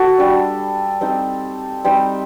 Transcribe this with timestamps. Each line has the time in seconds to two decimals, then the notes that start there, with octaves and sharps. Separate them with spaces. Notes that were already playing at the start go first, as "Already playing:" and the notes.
Already playing: F#4 A4
0.18 G3 D4
1.01 G3 C4 D#4
1.84 G3 C4 D#4